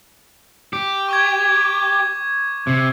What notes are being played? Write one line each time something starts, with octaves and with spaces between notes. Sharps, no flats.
G4
C#6 D6 G#6
C3